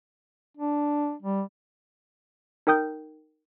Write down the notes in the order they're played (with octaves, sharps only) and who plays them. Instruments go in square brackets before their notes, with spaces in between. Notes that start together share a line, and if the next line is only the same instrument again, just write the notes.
[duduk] D4
G3
[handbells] D#4 A#4 G5 D#6 G6